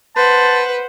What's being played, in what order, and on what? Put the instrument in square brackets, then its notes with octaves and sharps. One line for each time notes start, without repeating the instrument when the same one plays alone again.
[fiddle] B4 [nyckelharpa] C5 F#5 [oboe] A5